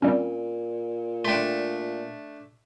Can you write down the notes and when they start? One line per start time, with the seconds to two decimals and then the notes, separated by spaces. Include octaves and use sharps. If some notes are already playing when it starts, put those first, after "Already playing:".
0.02 A#2 G3 C4 C#4
1.25 A3 D4 G5 C6